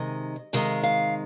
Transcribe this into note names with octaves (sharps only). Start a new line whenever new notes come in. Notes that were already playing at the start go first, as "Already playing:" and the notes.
Already playing: C3 D#3 G#3 D#5
C3 D#3 G#3 F5
F5